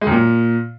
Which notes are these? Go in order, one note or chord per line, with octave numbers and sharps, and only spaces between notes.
G#3
F#2
A#2